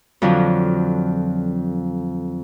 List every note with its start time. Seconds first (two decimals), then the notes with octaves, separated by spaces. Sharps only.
0.22 F2 D3 F3 F#3